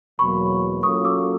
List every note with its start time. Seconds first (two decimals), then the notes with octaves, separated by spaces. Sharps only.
0.19 E2 B2 F#3 A#3 B5 C#6
0.83 F#3 A#3 C#4 F4 A4 C#6 D#6
1.05 D6 E6